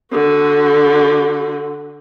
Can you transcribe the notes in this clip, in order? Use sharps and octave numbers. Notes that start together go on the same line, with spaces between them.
D3 F#4